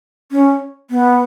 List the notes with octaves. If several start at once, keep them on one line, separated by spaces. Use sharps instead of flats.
C#4
B3